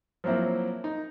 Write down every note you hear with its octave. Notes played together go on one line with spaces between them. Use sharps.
F3 F#3 A#3 C4 E4
D#4